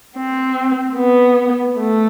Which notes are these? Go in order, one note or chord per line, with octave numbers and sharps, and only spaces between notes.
C4
B3
A3